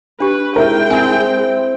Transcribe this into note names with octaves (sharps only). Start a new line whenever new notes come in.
D4 G4 B4
G#3 E4 A#4 G5
C4 E4 A#4 G#5